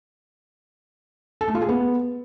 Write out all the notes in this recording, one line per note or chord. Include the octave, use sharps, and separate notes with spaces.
A4
A3
F4
G#4
B3